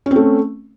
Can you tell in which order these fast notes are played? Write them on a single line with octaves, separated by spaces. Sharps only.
C#4 C4 A3